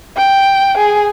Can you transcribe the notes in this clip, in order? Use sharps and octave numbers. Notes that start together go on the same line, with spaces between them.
G5
G#4